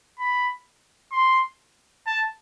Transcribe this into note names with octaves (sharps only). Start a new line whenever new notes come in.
B5
C6
A5